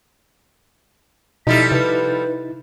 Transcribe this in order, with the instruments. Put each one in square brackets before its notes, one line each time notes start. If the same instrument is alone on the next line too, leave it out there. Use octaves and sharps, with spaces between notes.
[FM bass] B2 [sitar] F3 G3 A4 [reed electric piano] D#4 E4 A6 [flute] B6
[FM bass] C3 [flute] B4